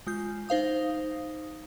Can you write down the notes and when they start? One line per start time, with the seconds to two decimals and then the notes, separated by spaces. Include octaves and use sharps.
0.07 G#3 F4 G6
0.49 D#4 C5 F5 D#6